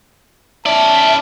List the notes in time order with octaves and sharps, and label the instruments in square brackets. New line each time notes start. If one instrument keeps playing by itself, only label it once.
[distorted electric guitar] C#4 D5 [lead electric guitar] E4 [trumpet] A5